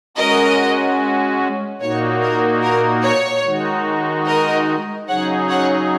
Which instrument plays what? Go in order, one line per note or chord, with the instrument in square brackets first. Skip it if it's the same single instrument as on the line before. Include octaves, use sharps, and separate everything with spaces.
[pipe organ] G#3 C#4 F#4 [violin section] A#4 D#5
[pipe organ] A#2 A#3 D#4 F#4 [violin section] C#5
[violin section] A#4
A#4
C#5
[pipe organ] D#3 G#3 D#4 F#4
[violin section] A#4 D#5
[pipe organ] C#3 F#3 D#4 G#4 [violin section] C#5 F#5
[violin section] C#5 F#5